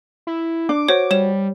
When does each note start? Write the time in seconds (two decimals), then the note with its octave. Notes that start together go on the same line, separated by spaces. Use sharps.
0.27 E4
0.69 D4 D6
0.89 F#4 C5 C#5
1.11 G3 C#5 E7